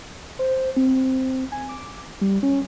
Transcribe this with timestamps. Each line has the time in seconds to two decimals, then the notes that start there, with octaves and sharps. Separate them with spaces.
0.39 C5
0.76 C4
1.52 G#5
1.69 D6
2.21 G3
2.43 C#4